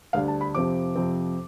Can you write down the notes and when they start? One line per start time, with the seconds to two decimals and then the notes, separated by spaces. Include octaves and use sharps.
0.13 D2 D3 G3 D4 F5
0.28 A5
0.41 B5
0.55 F2 C3 F3 C4 D6
0.96 F2 C3 F3 C4